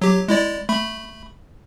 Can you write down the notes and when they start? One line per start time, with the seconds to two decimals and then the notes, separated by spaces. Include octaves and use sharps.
0.02 F#3 G4
0.28 G#3 E4 D5
0.69 A3 B5